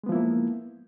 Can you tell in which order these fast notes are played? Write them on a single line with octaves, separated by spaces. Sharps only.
G#3 B3 F3 E4 A#3